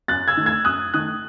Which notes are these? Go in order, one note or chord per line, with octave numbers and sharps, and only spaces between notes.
F#2 F#6 A6
E6 G#6
D#3 A3
E6 G#6
F#2 D#6 F#6
D#3 A3 D#6 F#6